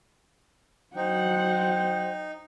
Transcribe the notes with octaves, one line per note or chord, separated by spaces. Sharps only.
F#3 D#4 C5 F#5 G5